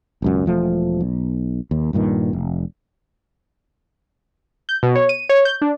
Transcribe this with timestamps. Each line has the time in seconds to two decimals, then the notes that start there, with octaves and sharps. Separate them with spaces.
0.22 E1 C#2 F#2
0.46 E1 F3 A3
1.01 B1
1.71 D#2
1.93 D#1 G2 A#2 D#3
2.33 F1
4.69 G6
4.83 B2
4.95 C#5
5.09 D#7
5.29 C#5
5.45 G6
5.62 D4